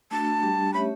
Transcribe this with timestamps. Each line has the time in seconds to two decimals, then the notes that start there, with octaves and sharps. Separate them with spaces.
0.11 A3 D4 F#4 A5
0.42 G3 D4 G4
0.73 A3 C#4 G4 C#5 E5 B5